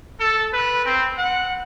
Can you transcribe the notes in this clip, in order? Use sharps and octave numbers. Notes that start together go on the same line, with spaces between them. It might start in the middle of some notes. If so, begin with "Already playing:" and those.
A4
B4
C4
F#5